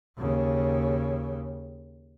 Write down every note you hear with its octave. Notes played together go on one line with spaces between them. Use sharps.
D#2 C#3